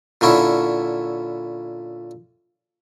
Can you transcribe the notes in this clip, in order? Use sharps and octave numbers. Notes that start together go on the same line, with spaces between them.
A#2 D3 C#4 E4